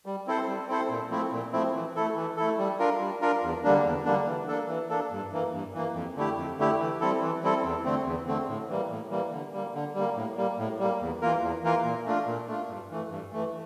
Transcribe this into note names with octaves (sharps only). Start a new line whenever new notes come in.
G3
C4 E4 A4 C5
G3
C4 E4 A4 C5
A#2
F3 A3 C4 E4
A#2
F3 A3 C4 E4
E3
A3 E4 A4
E3
A3 E4 A4
G3
D4 F4 A#4
G3
D4 F4 A#4
E2
D3 G3 A#3 D4
E2
D3 G3 A#3 D4
E3
A#3 D4 A4
E3
A#3 D4 A4
G2
E3 A#3
G2
E3 A#3
F2
D3 A3 E4 G4
F2
D3 A3 E4 G4
E3
G3 C4 E4 A4
E3
G3 C4 E4 A4
E2
D3 A3 C4
E2
D3 A3 C4
A2
E3 G3 A#3
A2
E3 G3 A#3
D3
G3 A#3
D3
G3 A#3
A2
G3 A#3
A2
G3 A#3
E2
E3 A#3 F4 A#4
E2
E3 A#3 F4 A#4
A#2
A3 D4 F4
A#2
A3 D4 F4
G2
E3 A3
G2
E3 A3